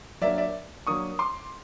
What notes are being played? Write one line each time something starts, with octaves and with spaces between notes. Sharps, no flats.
F#3 A#3 D4 D5 E5
D5 E5
F#3 A#3 D4 C#6 D#6
C6 D6